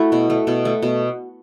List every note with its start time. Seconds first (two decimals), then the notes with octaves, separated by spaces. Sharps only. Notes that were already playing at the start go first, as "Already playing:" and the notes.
Already playing: A3 E4 F#4
0.12 B2
0.30 A3
0.47 B2
0.65 A3
0.82 B2